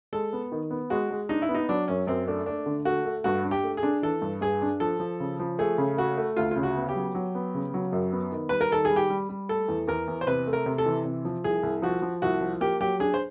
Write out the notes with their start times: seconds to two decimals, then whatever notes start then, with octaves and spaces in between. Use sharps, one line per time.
0.13 G#3 A4
0.33 B3
0.52 D#3
0.71 B3
0.90 G#3 F#4
1.11 G#3
1.29 D4 D#4
1.42 E4
1.49 B3
1.55 D#4
1.69 F#3 D4
1.88 F#2 C#4
2.07 F#2 C4
2.27 A3 D4
2.46 A3 D4
2.66 D3
2.85 A3 F#4
3.05 A3
3.24 G2 F#4
3.44 D4
3.51 G4
3.63 A3
3.77 G#4
3.83 D4
4.02 E3 A4
4.22 G2
4.41 G2 G#4
4.62 D4
4.80 F3 A4
5.00 F3
5.20 C#3
5.40 F3
5.59 A3 G#4
5.78 C#3
5.97 A3 F#4
6.17 A3
6.37 D2 F4
6.51 C#3 F4
6.63 F#4
6.76 B3
6.89 G4
6.96 F#3
7.15 F#3
7.35 B3
7.54 C#3
7.74 F#3
7.93 F#2
8.12 B3
8.32 D#3
8.49 G3 B4
8.61 A#4
8.70 D#3 A4
8.85 G#4
8.90 G3
8.96 G4
9.10 G3
9.29 G3
9.49 A3 A4
9.68 E2
9.88 E2 A#4
10.08 E2
10.21 C5
10.27 C3 B4
10.47 A3
10.53 A#4
10.66 C3
10.78 A4
10.86 E3
11.05 C3
11.25 F3
11.44 C2 G#4
11.63 C2
11.82 F3 F#4
12.02 F3
12.22 C2 F#4
12.41 F3
12.61 A#3 G4
12.80 F#3 G4
13.00 D4 G#4
13.14 C5